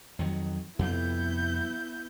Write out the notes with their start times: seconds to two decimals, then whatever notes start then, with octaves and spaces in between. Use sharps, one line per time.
0.19 F2 D#3 F#3
0.79 F2 C3 G3 B3 E4 G6